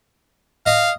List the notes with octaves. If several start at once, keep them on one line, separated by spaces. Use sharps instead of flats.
D#5 F5